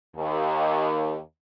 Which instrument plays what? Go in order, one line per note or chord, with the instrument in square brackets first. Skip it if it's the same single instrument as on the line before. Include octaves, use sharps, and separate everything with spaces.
[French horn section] D#2